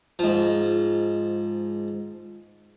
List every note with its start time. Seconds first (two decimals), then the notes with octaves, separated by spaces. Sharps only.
0.19 G#2 F3